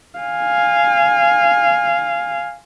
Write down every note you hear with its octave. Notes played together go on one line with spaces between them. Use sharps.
F5 G#5